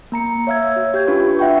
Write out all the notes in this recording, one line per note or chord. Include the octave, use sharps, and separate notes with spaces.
A#3 A#5 C#7
C#5 E5 F5 E6 G#6
F#4
G4 G6 G#6
C#4 D4 E4 F4 B4 C#6
E5 F#5 G5 C#6